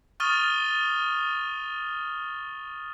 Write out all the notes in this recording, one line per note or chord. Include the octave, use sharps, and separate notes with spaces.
C#6 D#6 F6 A6 D#7 G7